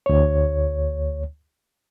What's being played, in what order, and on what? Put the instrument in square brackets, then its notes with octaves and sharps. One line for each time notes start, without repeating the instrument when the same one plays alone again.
[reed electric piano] D2 C#5